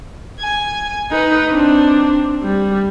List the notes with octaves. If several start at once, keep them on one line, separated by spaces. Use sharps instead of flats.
G#5
D#4 B4
C4 D4
G3